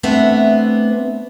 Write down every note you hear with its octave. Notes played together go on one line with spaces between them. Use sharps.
A3 B3 C4 D4 E5